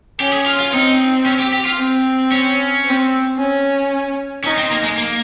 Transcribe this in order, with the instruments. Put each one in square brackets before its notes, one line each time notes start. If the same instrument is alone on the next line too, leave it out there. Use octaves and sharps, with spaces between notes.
[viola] C#4 [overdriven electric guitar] G4
[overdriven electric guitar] G#4
F4
F4
[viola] C4 [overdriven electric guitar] D#4
[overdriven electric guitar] C#4
G4
G4
F4
[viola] C4
[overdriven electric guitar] C#4
[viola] C4
C#4
[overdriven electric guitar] C#4 [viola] D#4
[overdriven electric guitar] C4
A#3
G#3
A#3